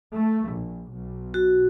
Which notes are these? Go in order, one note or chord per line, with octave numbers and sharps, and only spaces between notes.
A3
A#1
B1
F#4